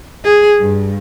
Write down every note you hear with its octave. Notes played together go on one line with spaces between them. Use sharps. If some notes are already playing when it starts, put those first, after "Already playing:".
G#4
G2